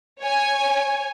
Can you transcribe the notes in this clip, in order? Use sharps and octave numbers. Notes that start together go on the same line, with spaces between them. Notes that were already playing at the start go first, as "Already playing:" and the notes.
C#5 G#5